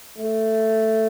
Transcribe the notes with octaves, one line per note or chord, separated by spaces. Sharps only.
A3